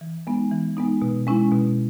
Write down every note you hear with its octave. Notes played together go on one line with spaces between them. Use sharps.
E3
G#3 B3 D#4
E3
G#3 B3 D#4
B2
G#3 C#4 E4
B2